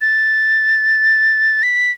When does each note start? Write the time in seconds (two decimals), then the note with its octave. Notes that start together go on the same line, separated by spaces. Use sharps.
0.01 A6
1.63 B6